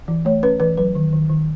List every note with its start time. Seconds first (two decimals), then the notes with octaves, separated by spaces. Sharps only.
0.08 E3
0.25 A3 C#5
0.43 C#4 B4
0.60 E3 B4
0.77 F#3 B4
0.95 D#3
1.13 D#3
1.30 D#3